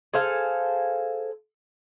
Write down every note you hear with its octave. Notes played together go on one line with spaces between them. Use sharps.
G#4 A4 C5 F5